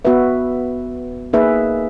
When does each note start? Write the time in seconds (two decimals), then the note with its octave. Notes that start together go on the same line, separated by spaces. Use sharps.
0.05 B3 F#4 B4 E5
1.33 A#3 D#4 G#4 B4 E5